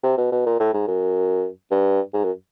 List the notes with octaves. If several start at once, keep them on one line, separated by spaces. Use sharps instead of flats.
C3
B2
B2
A#2
A2
G#2
F#2
G2
G#2
F#2